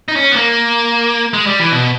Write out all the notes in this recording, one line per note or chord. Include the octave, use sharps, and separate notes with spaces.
D#4
C#4
B3
A#3
G#3
G3
E3
B2